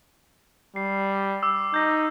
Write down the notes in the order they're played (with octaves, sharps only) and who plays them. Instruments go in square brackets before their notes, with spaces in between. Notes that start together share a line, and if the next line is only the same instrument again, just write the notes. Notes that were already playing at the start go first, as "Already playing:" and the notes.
[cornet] G3 [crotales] C7
[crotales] D6 E6
[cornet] D#4 [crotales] G6 A#6